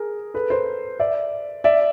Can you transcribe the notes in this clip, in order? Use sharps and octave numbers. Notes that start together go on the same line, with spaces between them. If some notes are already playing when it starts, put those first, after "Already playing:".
Already playing: G#4 A#4
A4 B4
A#4 C5
D5 E5
D5 E5